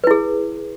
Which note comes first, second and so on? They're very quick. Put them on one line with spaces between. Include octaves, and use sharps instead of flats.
B4 E4 G#4